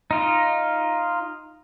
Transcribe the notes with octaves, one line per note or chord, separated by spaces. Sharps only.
D#4 F4